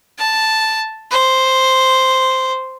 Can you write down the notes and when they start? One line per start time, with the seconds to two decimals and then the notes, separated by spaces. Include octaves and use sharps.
0.19 A5
1.11 C5